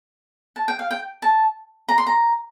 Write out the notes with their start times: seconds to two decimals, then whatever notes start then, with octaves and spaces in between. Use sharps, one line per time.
0.56 A5
0.68 G5
0.79 F5
0.91 G5
1.22 A5
1.88 A#5
1.98 C6
2.06 A#5